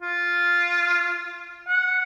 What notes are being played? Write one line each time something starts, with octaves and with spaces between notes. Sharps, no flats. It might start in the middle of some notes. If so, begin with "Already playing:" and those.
F4
F#5